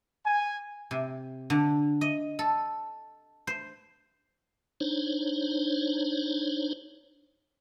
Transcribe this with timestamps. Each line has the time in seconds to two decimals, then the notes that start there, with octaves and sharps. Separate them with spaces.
0.25 G#5
0.91 C3
1.50 D3
2.01 D#5
2.39 A4
3.47 C5
4.81 D4 D#4 C5 C#5